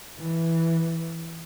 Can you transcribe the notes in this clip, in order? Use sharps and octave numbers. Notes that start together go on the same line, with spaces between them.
E3